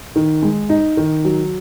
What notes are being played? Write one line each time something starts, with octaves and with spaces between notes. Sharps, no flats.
D#3
G#3
D#4
D#3
F#3